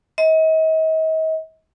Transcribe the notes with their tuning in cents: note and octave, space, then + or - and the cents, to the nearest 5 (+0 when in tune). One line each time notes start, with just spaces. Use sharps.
D#5 +40